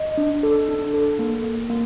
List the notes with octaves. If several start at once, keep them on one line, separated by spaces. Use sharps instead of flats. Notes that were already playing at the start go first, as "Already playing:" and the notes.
Already playing: D#5
D4
A4
D4
A4
A#3
A#3
A#3